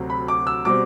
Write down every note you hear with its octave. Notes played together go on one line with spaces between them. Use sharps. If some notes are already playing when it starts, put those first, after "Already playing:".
Already playing: D2 C3 F#3
B5
D6
E6
B2 G3 C4 D6